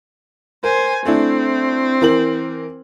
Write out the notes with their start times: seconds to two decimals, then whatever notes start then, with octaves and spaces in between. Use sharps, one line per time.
0.64 A#4 C5 G#5
1.05 A3 C4 D4 E4
2.01 E3 A#4 F#7